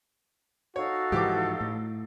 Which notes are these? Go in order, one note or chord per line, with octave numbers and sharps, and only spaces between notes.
D#4 F#4 A4 C#5 F5
G#2 E3 F3 G4 D6
A2